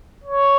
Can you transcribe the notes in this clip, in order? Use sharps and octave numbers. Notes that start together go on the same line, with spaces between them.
C#5